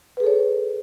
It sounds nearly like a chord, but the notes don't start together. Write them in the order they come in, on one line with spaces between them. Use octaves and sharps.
B4 G#4 A4 C#5